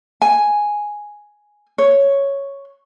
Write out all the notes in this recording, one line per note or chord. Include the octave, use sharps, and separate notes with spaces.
G#5
C#5